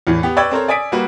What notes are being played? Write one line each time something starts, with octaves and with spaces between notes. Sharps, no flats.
E2 A2 E3
B3 G4
B4 D5 G5 C#6 E6 G#6
C4 A4 A#4 C5 C#5
D5 G#5 D#6 B6 D7
G3 A#3 F#4 B4